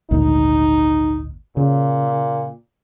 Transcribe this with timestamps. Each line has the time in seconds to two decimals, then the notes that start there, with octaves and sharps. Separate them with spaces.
0.11 G#1 D2 A#2 D#4
1.57 A#2 C#3